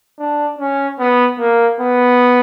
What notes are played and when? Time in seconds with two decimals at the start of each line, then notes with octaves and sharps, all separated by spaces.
0.19 D4
0.59 C#4
1.00 B3
1.39 A#3
1.81 B3